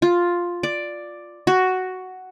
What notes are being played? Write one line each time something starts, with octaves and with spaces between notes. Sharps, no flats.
F4
D5
F#4